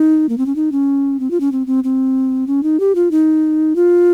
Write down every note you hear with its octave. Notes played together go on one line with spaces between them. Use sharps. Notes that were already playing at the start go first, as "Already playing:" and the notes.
Already playing: D#4
A#3
C4
C#4
D#4
C#4
C4
F4
C#4
C4
C4
C4
C#4
D#4
G4
F4
D#4
F4